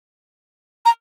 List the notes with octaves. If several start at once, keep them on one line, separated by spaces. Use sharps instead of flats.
A#5